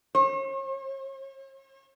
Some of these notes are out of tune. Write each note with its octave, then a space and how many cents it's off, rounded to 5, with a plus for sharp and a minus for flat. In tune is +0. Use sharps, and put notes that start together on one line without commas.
C#5 -45